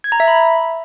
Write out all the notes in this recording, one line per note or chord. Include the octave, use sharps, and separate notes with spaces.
G#6
A#5
E5
B5